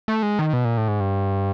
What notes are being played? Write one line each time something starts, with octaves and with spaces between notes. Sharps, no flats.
A3
G#3
D#3
B2
A#2
A2
G#2
G2